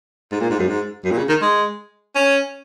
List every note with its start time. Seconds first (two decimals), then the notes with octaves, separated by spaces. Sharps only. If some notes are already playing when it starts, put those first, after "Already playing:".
0.32 G#2
0.41 A#2
0.50 G#2
0.59 F#2
0.68 G#2
1.04 F#2
1.12 A#2
1.18 C#3
1.29 D#3
1.41 G#3
2.15 C#4